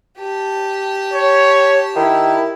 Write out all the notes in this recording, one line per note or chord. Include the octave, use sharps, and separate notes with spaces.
G4 A5
C#5
D#3 E4